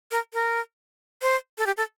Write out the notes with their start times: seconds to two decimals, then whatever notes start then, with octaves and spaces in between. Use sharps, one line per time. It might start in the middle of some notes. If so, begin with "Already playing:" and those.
0.11 A#4
0.33 A#4
1.22 C5
1.58 A4
1.66 G4
1.77 A4